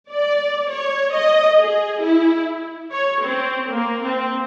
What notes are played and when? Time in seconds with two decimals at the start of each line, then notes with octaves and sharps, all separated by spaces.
0.11 D5
0.71 C#5
1.14 D#5
1.59 G#4
2.03 E4
2.92 C#5
3.23 C4
3.68 A#3
4.03 C4